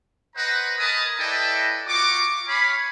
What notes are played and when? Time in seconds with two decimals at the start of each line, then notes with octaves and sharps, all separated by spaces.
0.36 B4 C5 D#5 F#5 A#5
0.79 A#4 D#5 G#5 A5 B5 D#6
1.19 E4 A4 B4 D5 D#5 G5
1.87 F4 F#4 C#6 D6
2.48 C#5 F5 G#5 B5